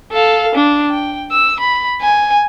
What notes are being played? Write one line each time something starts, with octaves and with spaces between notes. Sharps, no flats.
A4 F5
D4
G5
E6
B5
G#5